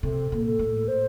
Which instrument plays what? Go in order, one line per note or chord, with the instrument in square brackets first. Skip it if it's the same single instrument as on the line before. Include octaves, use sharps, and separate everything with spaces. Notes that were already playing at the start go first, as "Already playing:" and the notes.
[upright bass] C3 [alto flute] A4
[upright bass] A#2
[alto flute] A4
[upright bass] A2
[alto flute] C5